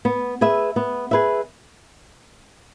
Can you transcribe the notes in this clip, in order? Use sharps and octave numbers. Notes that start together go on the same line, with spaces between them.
B3
G#4 B4 E5
B3
G#4 B4 E5